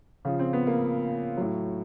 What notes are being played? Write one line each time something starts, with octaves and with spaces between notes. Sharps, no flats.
C#3 F3
C4
B3
A#3
A2 F#3